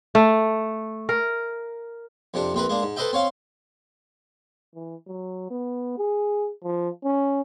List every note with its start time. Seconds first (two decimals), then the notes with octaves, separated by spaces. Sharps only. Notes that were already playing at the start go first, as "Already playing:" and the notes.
0.15 A3
1.09 A#4
2.34 F2 C3 D4
2.54 A#1 C4 A#4 B4
2.69 G#3 A#3 D4
2.83 G#2
2.96 A4 B4 C5 D#5 E5 G5
3.13 C4 C#5 F5 C6
4.75 E3
5.07 F#3
5.51 B3
5.98 G#4
6.64 F3
7.04 C#4